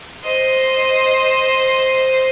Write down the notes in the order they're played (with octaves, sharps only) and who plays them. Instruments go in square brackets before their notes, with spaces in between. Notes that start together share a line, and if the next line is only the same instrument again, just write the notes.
[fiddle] C5 D#5